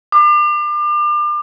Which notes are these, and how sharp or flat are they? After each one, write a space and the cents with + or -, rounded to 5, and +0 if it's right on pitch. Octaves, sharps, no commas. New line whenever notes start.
D6 +35